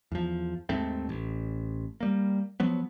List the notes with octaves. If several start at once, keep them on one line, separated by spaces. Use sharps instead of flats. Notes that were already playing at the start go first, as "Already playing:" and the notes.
E2 F3
D#2 G#2 A3 C4
A1
G3 A#3
F3 F#3 B3